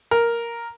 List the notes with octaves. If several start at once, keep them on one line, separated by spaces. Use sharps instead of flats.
A#4